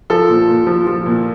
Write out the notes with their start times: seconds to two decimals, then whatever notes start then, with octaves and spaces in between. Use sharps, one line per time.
0.10 F3 A4
0.29 A#2
0.49 A#2
0.67 F3
0.87 F3
1.06 A#2